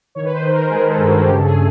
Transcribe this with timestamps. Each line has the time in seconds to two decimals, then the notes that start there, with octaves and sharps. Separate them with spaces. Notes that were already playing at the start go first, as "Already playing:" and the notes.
0.15 D#3 C#5
0.25 B4
0.33 C5
0.42 D#3
0.52 A#4
0.70 G#3 G#4
0.89 A4
0.98 G2
1.07 F#4
1.24 C#3 G4
1.36 A4
1.44 G#4
1.52 A3